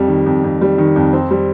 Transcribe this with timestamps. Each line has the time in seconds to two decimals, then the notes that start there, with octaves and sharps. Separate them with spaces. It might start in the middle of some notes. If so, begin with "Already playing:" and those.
Already playing: F2 G3
0.08 D#3
0.26 F2
0.44 F2
0.61 G3
0.78 D#3
0.96 F2
1.13 C4
1.31 G3